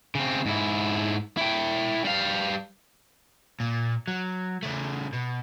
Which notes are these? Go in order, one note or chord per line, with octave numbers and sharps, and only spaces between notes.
C#3 C4
G#2 E4
E4 G5
G3 F5
A#2
F#3
C#3 A3
B2